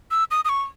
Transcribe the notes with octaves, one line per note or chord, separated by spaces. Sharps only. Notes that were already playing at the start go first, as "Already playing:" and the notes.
E6
D#6
D#6
C#6